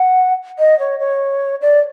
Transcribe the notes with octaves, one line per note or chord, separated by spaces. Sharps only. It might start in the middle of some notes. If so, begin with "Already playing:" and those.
Already playing: F#5
D#5
C#5
C#5
D5